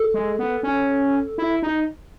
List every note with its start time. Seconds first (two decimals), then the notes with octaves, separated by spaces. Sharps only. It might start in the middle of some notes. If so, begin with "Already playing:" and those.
Already playing: A4
0.14 G#3
0.39 B3
0.63 C#4
1.38 E4
1.63 D#4